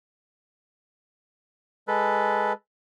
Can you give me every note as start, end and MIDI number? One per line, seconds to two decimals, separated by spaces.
1.88 2.53 56
1.88 2.53 69
1.88 2.53 71